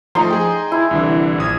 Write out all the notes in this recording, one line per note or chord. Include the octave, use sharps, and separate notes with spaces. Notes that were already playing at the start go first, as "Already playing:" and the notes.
F3 A3 D#4 C6
G#4 G5
E4
C2 D3 E3
A#1 D#6 G#6